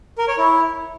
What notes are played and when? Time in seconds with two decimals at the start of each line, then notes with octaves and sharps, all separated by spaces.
0.18 A#4
0.28 C#5
0.38 E4